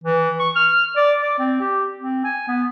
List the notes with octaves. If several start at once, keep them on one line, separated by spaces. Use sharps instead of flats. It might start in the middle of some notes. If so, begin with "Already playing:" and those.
E3
C#6
F6
D5
D5
C4
G4
C4
G#5
B3